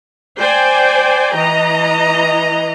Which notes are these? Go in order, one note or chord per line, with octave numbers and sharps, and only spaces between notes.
C5 D5 G5 G#5
E3 D#5 A#5